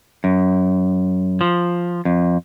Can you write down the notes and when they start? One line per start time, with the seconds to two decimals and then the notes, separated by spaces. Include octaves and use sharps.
0.24 F#2
1.41 F3
2.05 F2